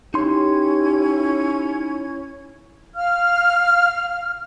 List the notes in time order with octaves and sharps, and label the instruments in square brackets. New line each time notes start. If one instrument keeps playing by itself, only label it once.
[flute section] C#4 E4 G#6 [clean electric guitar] D#4 C6 [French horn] G4
[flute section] F5 F6